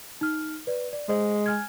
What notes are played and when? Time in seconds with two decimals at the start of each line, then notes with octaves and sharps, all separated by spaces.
0.21 D#4 F6
0.67 B4 D5
0.93 D5
1.09 G#3 C5
1.46 G#5 F6 G#6